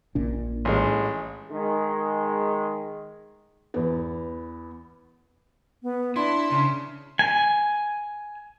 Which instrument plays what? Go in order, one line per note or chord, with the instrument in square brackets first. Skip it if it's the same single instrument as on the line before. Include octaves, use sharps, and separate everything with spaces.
[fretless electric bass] A#1 A#2 D4
[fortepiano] A1 G#3
[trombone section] D#3 G#3
[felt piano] E2 B3
[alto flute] B3
[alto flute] D4 [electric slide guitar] E4 [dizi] C6
[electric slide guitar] C#3
[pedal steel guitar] G#5